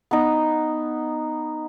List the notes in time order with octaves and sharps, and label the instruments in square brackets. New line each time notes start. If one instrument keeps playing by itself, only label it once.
[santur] B3 D#4